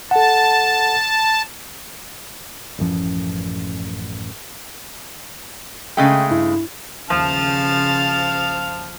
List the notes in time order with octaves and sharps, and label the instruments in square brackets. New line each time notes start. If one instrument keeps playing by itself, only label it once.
[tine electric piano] A4 F#5 [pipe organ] A5
[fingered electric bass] A1 F#2 F3 C#4
[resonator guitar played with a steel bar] C#3 G#3 A3 [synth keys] G5
[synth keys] G2 E4
[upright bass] G1 D#2 [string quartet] C#3 A6 [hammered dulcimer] F3 [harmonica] F5 A5 F6